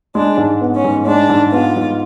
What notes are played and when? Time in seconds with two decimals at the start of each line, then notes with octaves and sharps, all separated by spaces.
0.15 G#3 D4
0.37 G#2
0.61 B3
0.76 C#4
0.84 G#2
1.07 G#3 D4
1.29 G#2
1.52 B3 F4
1.76 G#2